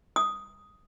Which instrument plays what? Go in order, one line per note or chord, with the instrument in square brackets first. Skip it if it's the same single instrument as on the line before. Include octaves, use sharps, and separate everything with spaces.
[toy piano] D#6